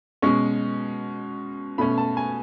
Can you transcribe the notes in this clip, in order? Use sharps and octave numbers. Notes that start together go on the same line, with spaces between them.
B2 G#3 C#4 C#6
B2 A3 C#4 B5
A5
G#5